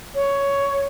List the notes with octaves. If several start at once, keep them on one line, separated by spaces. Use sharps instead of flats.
C#5